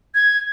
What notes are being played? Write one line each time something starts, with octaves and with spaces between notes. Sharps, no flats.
G#6